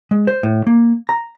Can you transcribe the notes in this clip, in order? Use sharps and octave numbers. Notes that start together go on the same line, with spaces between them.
G#3
C5
A2
A#3
A#5